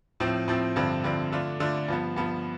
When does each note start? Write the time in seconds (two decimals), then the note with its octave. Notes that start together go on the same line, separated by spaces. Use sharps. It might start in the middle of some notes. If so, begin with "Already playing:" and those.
0.20 A2 F3 C4
0.48 A2 F3 C4
0.76 G2 D3 F3 C4
1.04 G2 D3 F3 C4
1.32 D3 A3 D4 F4
1.60 D3 A3 D4 F4
1.88 G2 F3 B3
2.16 G2 F3 B3